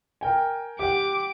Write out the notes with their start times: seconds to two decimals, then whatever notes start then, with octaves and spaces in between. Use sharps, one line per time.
0.21 A#4 G5 G#5
0.79 G4 F#5 D6